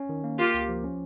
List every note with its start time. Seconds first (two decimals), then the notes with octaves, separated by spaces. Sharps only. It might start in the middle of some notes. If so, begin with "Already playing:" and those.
Already playing: C#4
0.09 D#3
0.24 A#3
0.39 A#3 F4 G4
0.54 C#2
0.69 F3
0.84 C#4